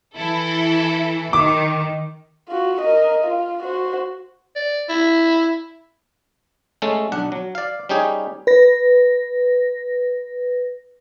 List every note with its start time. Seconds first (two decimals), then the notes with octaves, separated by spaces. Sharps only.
0.15 E3 E4 A4
1.33 D#3 D6
2.48 F4 F#4
2.81 A#4 D#5
3.24 F4
3.62 F#4 C5
4.56 D5
4.89 E4
6.82 G#3 A3 C#4 A4
7.12 B1 D4 F#5
7.32 F#3
7.55 D5 F5
7.89 G3 C#4 D#4 G4 G#4
8.47 B4 A#6